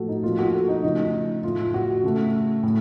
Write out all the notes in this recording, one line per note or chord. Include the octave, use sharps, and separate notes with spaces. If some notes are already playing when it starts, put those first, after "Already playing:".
Already playing: A2 F3 A3 F#4 A4
D#4
A#2 F3 A#3 F4
F#4
A4
D#4
C#3 F3 A3 D#4
A2 A3 F4
F#4
C#3 A3
A2